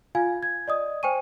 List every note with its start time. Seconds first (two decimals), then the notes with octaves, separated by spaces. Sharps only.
0.15 F4 F5 G#5 G#6
0.43 G#6
0.68 D5 D#5 D#6
1.03 C5 G5 G#5 C#6 D#7